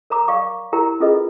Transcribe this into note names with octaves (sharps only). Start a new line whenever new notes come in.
A#4 C#5 A#5 D6
C#5 D5 F5 G5 C#6 D6
E4 G4 A#4 C#5 G5 A#5
C#4 F4 G#4 A4 B4 D#5